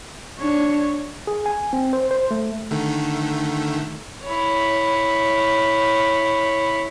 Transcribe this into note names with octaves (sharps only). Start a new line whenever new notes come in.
D4 C#5
G#4
G#5
C4
C5
C5
A3
D3 D#3 A3
E4 C#5